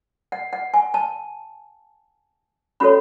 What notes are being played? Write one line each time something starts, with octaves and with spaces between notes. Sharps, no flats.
F#5
F#5
G#5
A5
C#4 F#4 A4 C#5 B5